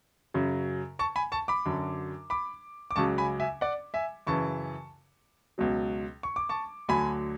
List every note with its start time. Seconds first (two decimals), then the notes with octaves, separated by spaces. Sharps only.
0.34 F#2 C#3 F#3
0.99 A5 C#6
1.16 G#5 B5
1.32 A5 C#6
1.48 B5 D6
1.66 F#2 D3 F#3
2.30 B5 D6
2.91 D6
2.96 C#2 C#3 F#3 A5 C#6
3.18 G#5 B5
3.40 E5 G#5
3.61 D5 F#5
3.94 E5 G#5
4.27 F#2 C#3 E3 A5 C#6
5.58 C#2 B2 F#3
6.23 C#6
6.36 D6
6.49 A5 C#6
6.88 D2 D3 F#3 G#5 B5